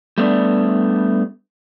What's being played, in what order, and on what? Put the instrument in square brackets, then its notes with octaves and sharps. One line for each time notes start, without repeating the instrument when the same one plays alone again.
[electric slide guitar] G3 A3 B3 D4